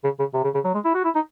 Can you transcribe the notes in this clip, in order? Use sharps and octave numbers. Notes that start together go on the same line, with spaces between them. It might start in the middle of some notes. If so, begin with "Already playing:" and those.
C#3
C#3
C3
C#3
C#3
F#3
G#3
E4
F#4
E4
D#4